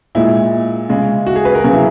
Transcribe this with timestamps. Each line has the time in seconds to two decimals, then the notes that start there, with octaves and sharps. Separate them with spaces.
0.15 A#2 G#3 E4
0.89 C#3 G#3
1.27 F#4
1.36 G#4
1.45 B4
1.55 A#4
1.64 C#3 F#3 G#4
1.73 E4